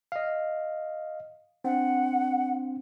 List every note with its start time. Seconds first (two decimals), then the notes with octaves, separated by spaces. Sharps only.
0.12 D#5 F5
1.64 C4 D4 F#5